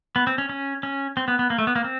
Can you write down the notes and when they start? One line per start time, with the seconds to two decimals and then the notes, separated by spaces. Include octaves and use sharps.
0.16 B3
0.27 C4
0.38 C#4
0.49 C#4
0.83 C#4
1.17 C4
1.28 B3
1.39 B3
1.50 A#3
1.58 A3
1.67 B3
1.76 A#3
1.84 C4